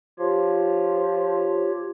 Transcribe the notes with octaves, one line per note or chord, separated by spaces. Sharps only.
F3 F4 G4 C#5